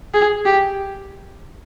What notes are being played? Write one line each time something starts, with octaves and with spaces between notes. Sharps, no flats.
G#4
G4